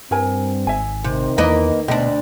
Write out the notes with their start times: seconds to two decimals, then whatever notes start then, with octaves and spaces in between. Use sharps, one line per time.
0.11 G2 C4 E4 A#4 G#5
0.67 G#1 E5 G#5
1.04 C3 D#3
1.38 E2 A#3 D4 B4 D#5
1.88 D2 B2 D4 D#5 E5 G5